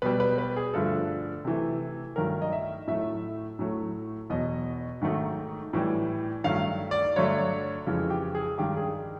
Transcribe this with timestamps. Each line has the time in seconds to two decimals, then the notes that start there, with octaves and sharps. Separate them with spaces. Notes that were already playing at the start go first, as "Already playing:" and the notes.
0.02 B2 G3 B4
0.20 B4
0.38 B4
0.56 G#4
0.74 G2 D3 F3 A3 A4
1.45 C3 E3 A3
2.16 G2 D#3 F#3 A3 A#4
2.42 D#5
2.52 E5
2.88 A2 F#3 A3 E5
3.59 A2 F#3 A3
4.30 E2 B2 F#3 D#5
5.01 G#2 D#3 F#3 A3
5.73 A2 E3 G3
6.44 G2 D#3 F#3 A3 F5
6.91 D5
7.16 G2 D3 F#3 A3 C#5
7.87 F2 C#3 E3 G#3
8.10 G4
8.35 G#4
8.58 G2 D#3 G#3 G4
8.77 G#4